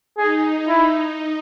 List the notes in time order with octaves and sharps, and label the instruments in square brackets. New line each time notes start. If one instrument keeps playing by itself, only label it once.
[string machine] D#4 [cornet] G#4
[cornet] E4